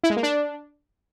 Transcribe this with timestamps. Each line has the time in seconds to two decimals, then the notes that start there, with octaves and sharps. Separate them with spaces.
0.04 E4
0.10 G#3
0.17 A#3
0.23 D4